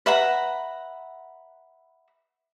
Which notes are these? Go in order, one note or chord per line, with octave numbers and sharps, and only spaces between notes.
B4 E5 F#5 A#5